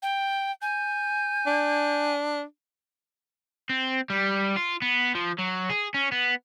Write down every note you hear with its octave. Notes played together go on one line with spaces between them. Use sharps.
G5
G#5 G6
D4
C4
G3
F4
B3
F3
F#3
G#4
C#4
B3